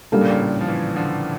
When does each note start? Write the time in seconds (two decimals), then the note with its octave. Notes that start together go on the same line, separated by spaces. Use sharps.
0.12 C#3 G3 A#3 D4 A4
0.21 A#2
0.30 A2 C#3
0.61 F3
0.68 C#3 E3
0.96 D3 F3